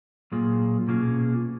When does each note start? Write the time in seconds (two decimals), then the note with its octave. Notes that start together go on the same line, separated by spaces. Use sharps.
0.32 A#2 F#3 A#3 F4 G#4
0.88 B2 A#3 C#4 F4 G#4